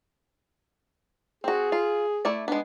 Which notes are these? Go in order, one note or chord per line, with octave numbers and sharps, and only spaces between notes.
C4 F#4 G#4
F4
A3 E4 D5
G#3 B3 D4